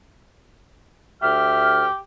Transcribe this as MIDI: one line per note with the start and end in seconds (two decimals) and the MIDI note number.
1.22 1.84 38
1.22 1.97 67
1.22 1.84 76
1.22 1.84 89